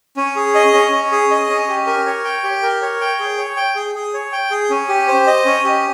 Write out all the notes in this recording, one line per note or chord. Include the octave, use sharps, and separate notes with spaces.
C#4
G#4
D#5
C#4
C#4
G#4
D#5
C#4
G4
A#4
C#5
G5
G4
A#4
C#5
G5
G#4
C#5
G5
G#4
G#4
C#5
G5
G#4
C#4
G4
C5
D#5
C#4
G4